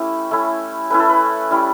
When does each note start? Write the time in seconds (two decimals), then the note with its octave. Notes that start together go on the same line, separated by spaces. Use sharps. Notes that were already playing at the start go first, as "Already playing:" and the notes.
Already playing: A3 C#4 E4 G4
0.31 A3 C#4 E4
0.91 A3 C#4 E4 B4
1.00 A4
1.10 B4
1.51 G3 C#4 E4